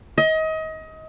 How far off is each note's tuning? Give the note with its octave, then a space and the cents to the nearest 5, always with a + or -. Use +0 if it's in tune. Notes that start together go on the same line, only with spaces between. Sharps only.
D#5 +30